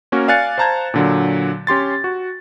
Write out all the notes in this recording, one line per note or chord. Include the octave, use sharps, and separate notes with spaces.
A#3 C#4 F#4 A#4
D5 F5 G#5 F#6 A6 C#7
C5 F5 A5 A#5 G6 G#6
A#2 D3 F#3
C#4 G4 C6 A6
F#4